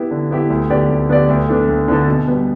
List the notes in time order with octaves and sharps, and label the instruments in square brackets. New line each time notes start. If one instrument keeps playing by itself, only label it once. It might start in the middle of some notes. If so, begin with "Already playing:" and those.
Already playing: [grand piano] B3 E4 G4
D3
B3 E4 G4
D2
D3 B3 G4 D5
D2
D3 B3 G4 D5
D2
D3 B3 D4 A4
D2
D3 B3 D4 A4
B2
G3 B3